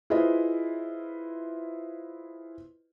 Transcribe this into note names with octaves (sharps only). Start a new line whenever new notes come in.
E4 F4 G#4 B4 C5 D#5